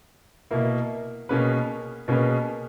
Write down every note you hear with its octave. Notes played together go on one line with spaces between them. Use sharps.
B2 A#3 E4
B2 A#3 C#4 G#4 B4
B2 A#3 C#4 G#4 B4